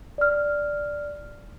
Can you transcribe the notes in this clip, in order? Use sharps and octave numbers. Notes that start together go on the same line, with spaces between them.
D5 F6